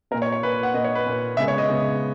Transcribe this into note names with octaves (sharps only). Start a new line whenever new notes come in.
A#2 A#3 A#4
C#5
C#5
A#2 A#3 B4
F#5
A#2 A#3 D#5
C#5
B4
A#2 A#3
C#3 G#3 B3 E5
C#5
D#5
C#3 G#3 B3